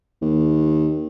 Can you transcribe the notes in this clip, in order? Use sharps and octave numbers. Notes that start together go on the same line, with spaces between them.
D#2